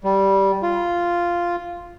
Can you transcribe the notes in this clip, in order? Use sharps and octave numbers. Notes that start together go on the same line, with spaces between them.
G3
F4